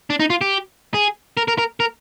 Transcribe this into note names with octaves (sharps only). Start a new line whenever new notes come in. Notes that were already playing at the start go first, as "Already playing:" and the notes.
D4
D#4
F4
G4
G#4
A#4
A#4
A#4
A#4